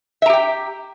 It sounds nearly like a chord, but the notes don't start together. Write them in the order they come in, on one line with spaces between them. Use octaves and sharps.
E5 A#5 G4 G5